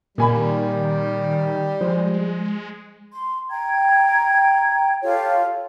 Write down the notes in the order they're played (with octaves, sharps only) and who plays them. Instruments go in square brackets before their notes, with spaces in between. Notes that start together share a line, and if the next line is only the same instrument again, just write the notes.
[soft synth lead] A#2 [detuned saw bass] D#3 [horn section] G3 [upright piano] A#3 G#5 B5
[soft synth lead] F3 [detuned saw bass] G#3 [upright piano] C5
[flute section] C6
G5 A#5 G#6
F4 G4 A4 C#5